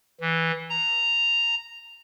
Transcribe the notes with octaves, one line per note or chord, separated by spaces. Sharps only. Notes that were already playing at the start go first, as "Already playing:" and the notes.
E3
A#5